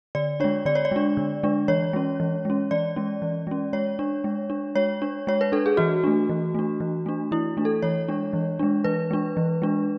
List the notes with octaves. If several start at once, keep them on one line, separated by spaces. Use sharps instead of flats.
D3 D5
G#3 D4 C#5
D3 D5
C#5
D5
G#3 D4
D3
G#3 D4
E3 C#5
G#3 C#4
E3
G#3 C#4
E3 D5
G#3 C#4
E3
G#3 C#4
G#3 C#5
D4
G#3
D4
G#3 C#5
D4
G#3 C#5
B4
D4 A4
G#4
E3 F#4
A3 D4
E3
A3 D4
E3
A3 D4
E3 E4
A3 D4
A4
E3 C#5
G#3 D4
E3
G#3 D4
E3 B4
G#3 D4
E3
G#3 D4